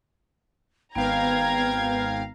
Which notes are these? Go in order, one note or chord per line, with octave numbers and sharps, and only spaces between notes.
G#1 B3 B4 F5 G5 A#5 G#6